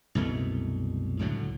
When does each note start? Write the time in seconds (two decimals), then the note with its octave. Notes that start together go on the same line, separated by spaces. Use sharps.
0.15 C2 F#2 B2 A3
1.19 C#2 A2 D3 F#3